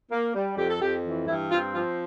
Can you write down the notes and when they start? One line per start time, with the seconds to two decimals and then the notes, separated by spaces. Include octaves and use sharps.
0.12 A#3
0.35 G3
0.57 F2 G4
0.70 A4
0.82 F2 G4
1.04 E3
1.27 G2 E4
1.51 C4 F4
1.74 F3 F4